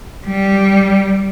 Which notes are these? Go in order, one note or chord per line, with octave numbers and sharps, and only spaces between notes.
G3